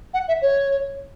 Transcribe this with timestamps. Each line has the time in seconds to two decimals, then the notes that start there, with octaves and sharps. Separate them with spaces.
0.13 F#5
0.28 E5
0.41 C#5